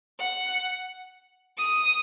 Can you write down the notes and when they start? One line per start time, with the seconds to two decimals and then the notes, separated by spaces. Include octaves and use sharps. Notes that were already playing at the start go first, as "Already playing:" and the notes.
0.20 F#5
1.58 D#6